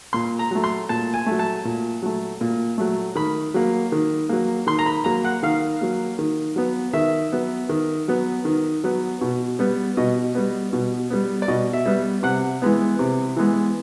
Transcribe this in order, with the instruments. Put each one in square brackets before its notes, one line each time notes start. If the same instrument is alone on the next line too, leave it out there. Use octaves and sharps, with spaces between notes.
[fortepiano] A#2 C6
A#5
F#3 A3
C6
A#2 A5
G#5
F#3 A3
A5
A#2
F#3 A3
A#2
F#3 A3
D#3 B5
F#3 A#3
D#3
F#3 A#3
D#3 C6
A#5
B5
F#3 A#3 A#5
F#5
D#3 F5
F#3 A#3
D#3
F#3 B3
D#3 E5
F#3 B3
D#3
F#3 B3
D#3
F#3 B3
B2
G3 B3
B2 D#5
G3 B3
B2
G3 B3
D5
B2 D#5
E5
G3 B3
C3 F#5
E3 G#3 B3
C3
E3 G#3 B3